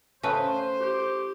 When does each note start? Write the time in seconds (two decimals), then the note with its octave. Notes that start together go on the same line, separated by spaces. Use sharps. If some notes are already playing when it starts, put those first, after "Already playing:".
0.23 C#3 A3 B4 C5
0.80 G4